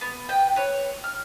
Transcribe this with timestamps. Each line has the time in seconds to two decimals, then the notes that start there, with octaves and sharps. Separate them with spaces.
0.01 B3
0.29 B4 G5
0.56 B4 C#5
1.04 F6